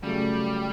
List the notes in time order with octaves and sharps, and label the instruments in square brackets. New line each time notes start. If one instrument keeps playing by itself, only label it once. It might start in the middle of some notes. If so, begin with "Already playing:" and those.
[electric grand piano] C#3 F#3 A3 [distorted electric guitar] G3